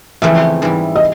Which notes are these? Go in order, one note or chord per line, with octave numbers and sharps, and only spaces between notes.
F2 C#3 E3 A3 C4 E5
G#2 E3 G3
D#5